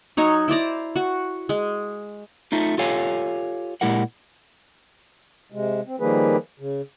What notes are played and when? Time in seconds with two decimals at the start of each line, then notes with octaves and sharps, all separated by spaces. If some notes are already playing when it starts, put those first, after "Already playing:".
0.17 F#3 D#4 C#5
0.48 E4 C5 D5 A#5
0.96 F#4
1.49 G#3
2.52 A3 D#4 F4
2.78 F4 G4 A4 C#5 F5 G#5
3.81 A#2 G#3 E4 G4 A#4 F#5
5.52 C3 G#3
5.86 C4
6.00 D#3 F3 G3 A#3 G#4 B4
6.59 C#3